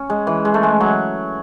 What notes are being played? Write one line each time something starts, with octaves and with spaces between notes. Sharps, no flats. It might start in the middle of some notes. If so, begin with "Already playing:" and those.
Already playing: C#4
G#3
E3
G#3
A3
G#3
F#3